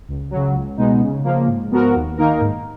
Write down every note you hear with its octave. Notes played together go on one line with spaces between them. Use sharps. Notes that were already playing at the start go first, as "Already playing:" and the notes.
C#2
C#3 F#3
C#2
B2 G#3 B3 D#4
C#3
F3 A#3
G#2
F3 B3 F#4 A#4
D#2
D#3 A#3 D#4 A#4
G#2